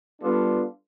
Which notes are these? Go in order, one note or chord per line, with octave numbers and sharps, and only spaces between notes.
G3 B3 D4 F4 A4